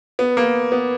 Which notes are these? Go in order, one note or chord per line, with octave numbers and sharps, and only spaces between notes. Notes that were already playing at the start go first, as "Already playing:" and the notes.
B3
A#3
B3